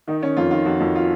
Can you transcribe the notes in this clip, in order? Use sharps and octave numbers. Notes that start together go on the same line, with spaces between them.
D#3 D#4
D#3 C#4
F2 F4
D#3 F4
F2 F#4
F2
F4